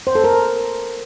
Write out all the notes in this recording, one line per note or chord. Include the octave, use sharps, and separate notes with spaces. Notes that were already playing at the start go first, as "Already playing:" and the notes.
C5
A4
A#4